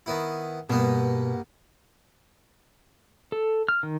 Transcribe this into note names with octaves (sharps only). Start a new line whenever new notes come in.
D#3 B3 E4
G2 B2 A#3 B3
A4
F6
D#3